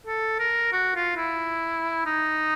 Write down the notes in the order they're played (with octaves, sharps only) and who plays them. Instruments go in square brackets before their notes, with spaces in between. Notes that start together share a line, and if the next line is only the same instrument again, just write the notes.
[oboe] A4
A#4
F#4
F4
E4
D#4